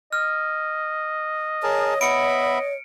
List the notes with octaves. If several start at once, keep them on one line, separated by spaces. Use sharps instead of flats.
D#5 F6
G#4 A#4 C#5 A5
B3 D#5 E5 B5 C#7 D7